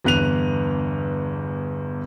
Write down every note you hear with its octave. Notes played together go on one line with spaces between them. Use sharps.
G1 E2 F#6 D#7 F7